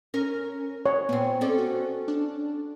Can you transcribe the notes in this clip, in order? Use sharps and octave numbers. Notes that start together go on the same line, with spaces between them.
C#4 A#4
C#5
A#2 B3 C4
C4 C#4 A4 D5
F#4
D4